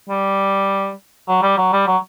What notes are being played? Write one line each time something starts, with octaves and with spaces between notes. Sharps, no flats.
G3
F#3
G3
F#3
G3
F#3